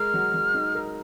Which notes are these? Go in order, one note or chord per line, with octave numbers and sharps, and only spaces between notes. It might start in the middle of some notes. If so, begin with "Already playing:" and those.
Already playing: G#3 A#4 F6
F#3
F#3
D#4
A#4